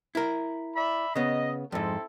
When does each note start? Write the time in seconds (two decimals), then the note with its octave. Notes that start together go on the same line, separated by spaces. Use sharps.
0.15 E4 A#4
0.76 D5 E5 B5
1.16 C#3 B3 D#5
1.72 F2 G#2 C4 E4 A4